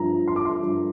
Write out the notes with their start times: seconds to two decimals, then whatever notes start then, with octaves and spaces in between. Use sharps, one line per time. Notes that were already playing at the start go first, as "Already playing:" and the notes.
Already playing: G2 F3 A#5
0.28 C6
0.36 D6
0.45 C6
0.63 G2 F3